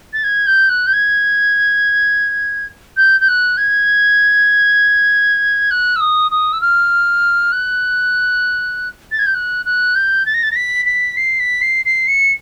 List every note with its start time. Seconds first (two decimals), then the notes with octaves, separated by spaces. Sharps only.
0.13 A6
0.24 G#6
0.47 G6
0.69 F#6
0.87 G6
0.93 G#6
2.97 G6
3.21 G6
3.28 F#6
3.57 G#6
5.71 F#6
5.96 E6
6.00 D#6
6.31 D#6
6.53 E6
6.61 F6
7.52 F#6
9.12 A6
9.19 G#6
9.26 G6
9.34 F#6
9.66 F#6
9.95 G6
10.26 A6
10.34 A#6
10.43 A6
10.52 A#6
10.56 B6
10.86 B6
11.17 C7
11.40 B6
11.62 C7
11.86 C7
12.08 C#7